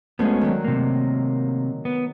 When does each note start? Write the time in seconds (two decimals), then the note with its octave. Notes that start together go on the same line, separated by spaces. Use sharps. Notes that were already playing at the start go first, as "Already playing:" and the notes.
0.19 D2 G#3 B3 C#4
0.41 D#3 F#3
0.64 C3 A#3
1.85 B3